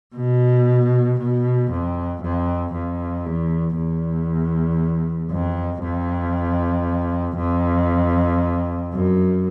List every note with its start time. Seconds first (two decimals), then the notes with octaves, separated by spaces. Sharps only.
0.15 B2
1.19 B2
1.70 F2
2.22 F2
2.73 F2
3.25 E2
3.77 E2
5.31 F2
5.83 F2
7.37 F2
8.92 F#2